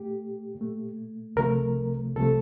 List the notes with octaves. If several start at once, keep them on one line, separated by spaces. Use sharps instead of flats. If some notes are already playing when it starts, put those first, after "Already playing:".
Already playing: A#2 A3 G4
A#2
A3
C2 C3 F3 A3 A#4
C2 C3 F3 A3 A4